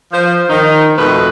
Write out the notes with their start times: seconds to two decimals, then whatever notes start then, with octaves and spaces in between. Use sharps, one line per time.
0.12 F3 C5
0.49 D#3 D#4
0.97 F2 B2 A3 B4